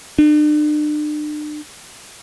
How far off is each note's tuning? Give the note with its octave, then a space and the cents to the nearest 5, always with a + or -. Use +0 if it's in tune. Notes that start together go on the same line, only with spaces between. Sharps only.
D4 +40